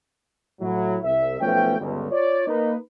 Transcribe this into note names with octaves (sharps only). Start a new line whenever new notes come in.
A2 F#3 E4
C2 E5
B1 F3 A3 B3 C#4 G5
G1 C#2
F4 C#5 D5
A#3 D#4 B4